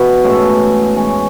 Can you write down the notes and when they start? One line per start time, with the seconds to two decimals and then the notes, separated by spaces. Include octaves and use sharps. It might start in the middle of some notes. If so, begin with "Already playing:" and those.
Already playing: E3 B3 F#4
0.24 A2 G#3 C#4
0.96 E3 G#3 C#4